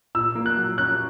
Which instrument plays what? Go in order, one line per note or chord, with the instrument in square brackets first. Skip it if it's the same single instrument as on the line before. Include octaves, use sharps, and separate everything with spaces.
[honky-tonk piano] A#2 [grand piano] E6
[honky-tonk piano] A#3
[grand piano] F#6
[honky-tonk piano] F#3
[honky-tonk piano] C#4 [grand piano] F#6